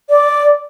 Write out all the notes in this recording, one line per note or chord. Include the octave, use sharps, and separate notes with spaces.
D5